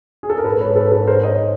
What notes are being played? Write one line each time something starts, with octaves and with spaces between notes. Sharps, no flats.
G#4
A4
A#4
G#2 A4 B4
B4 C#5
A4 B4
A4 B4
A#4 C5
C#5 D#5